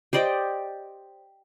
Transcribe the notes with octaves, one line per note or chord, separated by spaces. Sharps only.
G4 C5 D5 D#5